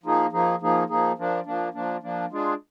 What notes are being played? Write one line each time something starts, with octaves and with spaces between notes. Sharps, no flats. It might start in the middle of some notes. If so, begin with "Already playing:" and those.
F3 A#3 D#4 G#4
F3 A#3 D#4 G#4
F3 A#3 D#4 G#4
F3 A#3 D#4 G#4
F3 A#3 D4
F3 A#3 D4
F3 A#3 D4
F3 A#3 D4
G#3 D4 F4 G#4